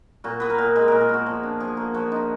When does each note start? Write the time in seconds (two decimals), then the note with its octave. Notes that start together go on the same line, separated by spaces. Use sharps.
0.24 A#2 F#4
0.40 B3 B4
0.50 A#4
0.58 A#2
0.76 G#3 B4
0.88 A#2 A#4
1.01 G#4
1.09 B3 F#4
1.26 F3
1.43 D4
1.60 F3 G#4
1.77 A#3 F#4
1.94 F3 F#4
2.11 D4 D#4